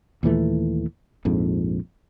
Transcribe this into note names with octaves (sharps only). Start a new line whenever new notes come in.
D#2 A#2 E3 A3
A#1 F2 G#2